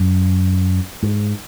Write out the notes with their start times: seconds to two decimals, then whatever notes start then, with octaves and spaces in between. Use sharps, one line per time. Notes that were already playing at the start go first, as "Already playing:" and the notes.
Already playing: F#2
1.03 G#2